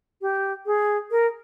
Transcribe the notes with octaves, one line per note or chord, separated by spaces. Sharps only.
G4
G#4
A#4